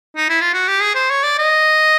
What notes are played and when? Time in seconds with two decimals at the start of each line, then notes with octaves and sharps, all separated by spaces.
0.17 D#4
0.29 E4
0.41 F4
0.54 F#4
0.68 G4
0.82 G#4
0.95 C5
1.10 C#5
1.23 D5
1.39 D#5